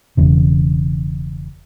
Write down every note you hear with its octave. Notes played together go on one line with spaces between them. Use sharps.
E1 E2 C#3